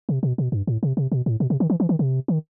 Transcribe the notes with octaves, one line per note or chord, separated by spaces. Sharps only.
C3
B2
B2
G2
A2
C3
C3
B2
A2
B2
C3
D#3
E3
E3
D#3
C3
D#3